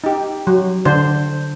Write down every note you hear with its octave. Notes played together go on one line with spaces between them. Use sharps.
D#4 G4
F#3
D3 D4 C5